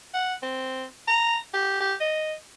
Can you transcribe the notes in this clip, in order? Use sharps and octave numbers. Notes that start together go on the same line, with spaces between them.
F#5
C4
A#5
G4
G4
D#5